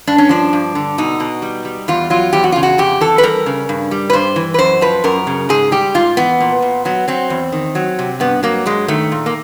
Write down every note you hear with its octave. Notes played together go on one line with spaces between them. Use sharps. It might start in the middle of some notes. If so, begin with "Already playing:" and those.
G2 D4
C#4
F3 D4
G2
D3
B2 D#4
B2
G3
G3
E2 F4
F#3 F4
E2 G4
F#4
C#3 F4
F#4
F2 G4
E3 A4
B4
G3 A#4
C#3
G2
G3
B4
G2 C5
E3
B4
F#2 C5
F3 B4
F#2 A#4
C#3
G#2 G#4
G3 G4
G#2 F4
E3 B3
A#2
A#2
F#3 B3
F#3 C4
E2
D#3
F#3
C3
G2 B3
F#3 A#3
G2 G#3
D#3 A3
A#2
A#3